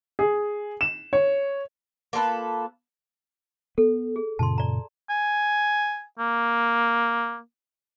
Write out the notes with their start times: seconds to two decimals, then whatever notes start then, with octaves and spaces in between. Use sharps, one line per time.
0.19 G#4
0.81 E7
1.13 C#5
2.13 A#3 F4 A4 B4
3.78 B3 A4
4.16 G#4
4.39 F#2 A#2 C#3 A5 C6
4.58 D5 A#5
5.10 G#5
6.19 A#3